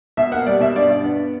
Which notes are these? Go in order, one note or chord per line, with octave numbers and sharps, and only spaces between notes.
B2 E5
A#3 F#5
G3 D5
B2 E5
G2 D5
G2
B3